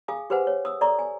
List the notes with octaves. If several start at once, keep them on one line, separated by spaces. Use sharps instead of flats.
G#4 F5 G#5 D#6
G4 G#4 B4 C5 F#5 G#5
C#5
D#6 E6
A4 D5 E5 A#5 C#6
G#5